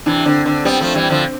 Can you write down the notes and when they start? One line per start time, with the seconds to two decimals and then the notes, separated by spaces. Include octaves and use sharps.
0.06 C3 E3 D4
0.26 D3 C4
0.46 D3 C4
0.65 G3 B3 C4
0.80 F3 A3
0.95 E3 G3
1.10 D3 F3